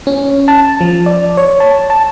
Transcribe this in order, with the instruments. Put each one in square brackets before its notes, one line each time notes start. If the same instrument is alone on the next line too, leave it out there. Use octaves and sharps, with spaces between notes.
[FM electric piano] C#4
A5
F3
D5
C#5
A5
A5